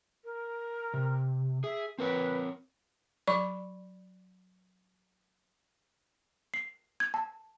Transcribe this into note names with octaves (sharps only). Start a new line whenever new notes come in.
A#4
C3
G#4 E5
C4 A#4 B4 C#5
F#3 D5 B5 C#6
C7
G#6
A5